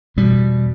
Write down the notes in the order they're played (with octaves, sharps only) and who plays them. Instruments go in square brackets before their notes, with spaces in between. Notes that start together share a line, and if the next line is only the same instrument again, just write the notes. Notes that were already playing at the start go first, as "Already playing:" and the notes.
[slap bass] E2 B2 G3